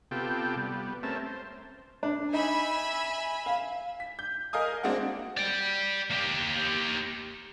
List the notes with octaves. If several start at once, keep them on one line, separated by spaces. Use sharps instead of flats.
C3 B3 F4 G4 A4 G5
G3 B3
A3 C4 C#4 A#4 E5 A5
C5
D4
D#4 E5 G#5 B5
F5
B6
G6
A#4 D#5 F5 G#5 D#6
G#3 A#3 C4 D4 F#4 F#5
D5 G5
A#3 G4